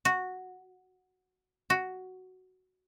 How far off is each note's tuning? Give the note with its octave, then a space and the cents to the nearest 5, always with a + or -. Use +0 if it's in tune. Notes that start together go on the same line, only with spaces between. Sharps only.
F#4 -5
F#4 +5